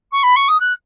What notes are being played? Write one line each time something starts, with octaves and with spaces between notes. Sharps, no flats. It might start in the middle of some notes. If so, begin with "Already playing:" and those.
C#6
B5
C#6
D#6
F#6